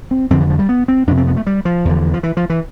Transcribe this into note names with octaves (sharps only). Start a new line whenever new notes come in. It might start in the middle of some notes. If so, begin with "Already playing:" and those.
C4
F2 D3 C4
E3
F3
G3
B3
C4
F2 C3 D4
C4
B3
A3
G3
F3
E2 D3
F3
E3
F3
E3